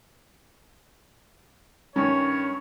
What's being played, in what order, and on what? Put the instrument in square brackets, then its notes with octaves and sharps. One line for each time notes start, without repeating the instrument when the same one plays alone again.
[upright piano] G2 D#3 C#4 [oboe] C#5